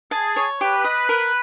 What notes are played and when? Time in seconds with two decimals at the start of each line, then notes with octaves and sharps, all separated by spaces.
0.11 G#4 A5
0.36 C#5
0.61 G4 B4
0.84 D#5
1.09 A#4